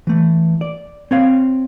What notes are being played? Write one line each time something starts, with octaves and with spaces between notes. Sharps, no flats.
E3 A3
D5
C4 C#5 F5